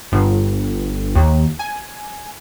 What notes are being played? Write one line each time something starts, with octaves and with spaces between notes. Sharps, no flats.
G1
D#2
G#5